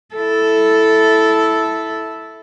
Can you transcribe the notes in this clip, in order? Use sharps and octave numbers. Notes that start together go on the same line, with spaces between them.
E4 A4